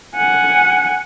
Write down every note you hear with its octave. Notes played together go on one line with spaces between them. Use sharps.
F#5 G#5